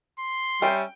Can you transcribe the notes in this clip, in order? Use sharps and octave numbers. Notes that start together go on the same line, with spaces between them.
C6
G3 C#4 E5 G5